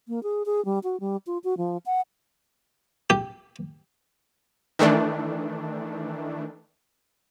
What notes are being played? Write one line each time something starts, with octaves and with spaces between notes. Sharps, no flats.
A#3
G#4
G#4
G3
F#4
G3
F4
F#4
F3
F#5
G4
D#3 E3 A3 D4